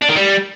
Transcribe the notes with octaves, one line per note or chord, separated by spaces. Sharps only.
D4
D#3
G3